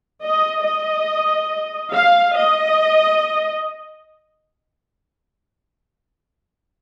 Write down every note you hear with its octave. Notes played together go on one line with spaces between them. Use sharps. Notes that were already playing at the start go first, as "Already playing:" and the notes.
D#5
D#5
F5
D#5